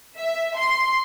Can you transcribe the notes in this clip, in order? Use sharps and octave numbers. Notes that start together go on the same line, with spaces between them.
E5
C6